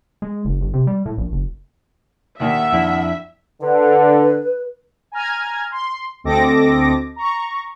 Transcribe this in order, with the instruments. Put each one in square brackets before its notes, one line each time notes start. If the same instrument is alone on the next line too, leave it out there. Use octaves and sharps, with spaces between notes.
[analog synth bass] G#3
F#1
G1
C3
G3
A2
A#1
F#1
[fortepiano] D#2 A#2 D#3 [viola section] E5 [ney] F#5
[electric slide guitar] F2 D4 E4
[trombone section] D3 [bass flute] B4
[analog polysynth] G#5 A#5 F6 G#6
C6
D2 C4 A4 D#5 D6 A#6
A#5 C#6